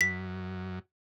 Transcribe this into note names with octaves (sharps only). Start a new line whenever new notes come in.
F#2 B6